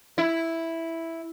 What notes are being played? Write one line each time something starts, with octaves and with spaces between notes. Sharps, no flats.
E4